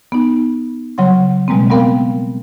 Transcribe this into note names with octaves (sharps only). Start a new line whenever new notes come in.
B3 D#4
C#3 F#3 G3 F#5 C6
B2 G3 G#3 A#3 C4
G3 B3 C4 A#4 F5 G5